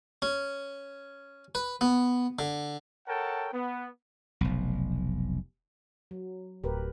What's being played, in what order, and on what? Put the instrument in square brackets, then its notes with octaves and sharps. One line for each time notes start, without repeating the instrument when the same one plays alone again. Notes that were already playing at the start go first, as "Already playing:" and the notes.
[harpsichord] C#4
B4
B3
D3
[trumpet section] A4 A#4 C#5 F#5 G5 A5
B3
[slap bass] F1 B1
[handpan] F#3
[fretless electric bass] D1 [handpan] G4 A#4 B4